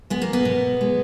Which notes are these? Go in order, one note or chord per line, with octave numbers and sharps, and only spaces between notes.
G#3 B3
A#3
B3
B2
G#3